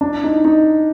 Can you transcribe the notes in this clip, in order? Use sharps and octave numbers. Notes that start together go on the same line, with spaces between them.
D4
D#4
D#4